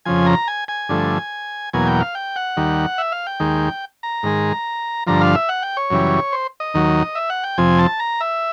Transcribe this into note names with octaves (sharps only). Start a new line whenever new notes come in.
F2 C#3 F3 G#5
A#5
G#5
G#5
G2 D3 F3 A3
E2 B2 F#3 A#3 G#5
G5
F5
G5
F#5
D#2 D#3 G3
E5
F5
G5
D#2 D#3 G#3
A#5
G#2 D#3 G#3
G2 D3 F3 A#5
F5
E5
F#5
G5
C#5
F#2 C#3 E3 G3
C5
D#5
D#2 D#3 F#3
E5
F#5
G5
F2 C3 F3 G#5
A5
A#5
E5